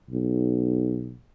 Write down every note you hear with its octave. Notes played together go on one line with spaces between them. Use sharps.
B1